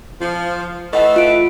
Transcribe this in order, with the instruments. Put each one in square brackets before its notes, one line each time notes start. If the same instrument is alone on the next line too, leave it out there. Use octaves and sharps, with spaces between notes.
[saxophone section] F3
[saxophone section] E3 A3 [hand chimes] D#5 F#5
[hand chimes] F4 D7